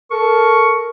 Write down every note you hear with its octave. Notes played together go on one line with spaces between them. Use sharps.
A4 A#4 C#6